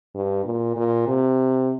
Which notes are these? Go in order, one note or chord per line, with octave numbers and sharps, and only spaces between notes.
G2
A#2
A#2
C3